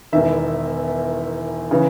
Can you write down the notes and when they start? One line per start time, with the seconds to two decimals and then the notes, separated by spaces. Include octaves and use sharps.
0.12 E1 E2 D#3 E5
1.71 C#3 E3